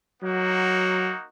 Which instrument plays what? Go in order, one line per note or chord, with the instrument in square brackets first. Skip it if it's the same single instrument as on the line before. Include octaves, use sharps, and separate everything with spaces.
[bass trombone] F#3 [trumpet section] A#3 D#4 F#4